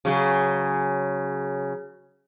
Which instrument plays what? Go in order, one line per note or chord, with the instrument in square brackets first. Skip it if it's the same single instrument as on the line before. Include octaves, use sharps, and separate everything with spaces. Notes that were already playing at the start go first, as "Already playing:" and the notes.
[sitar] C#3 F#3 G#4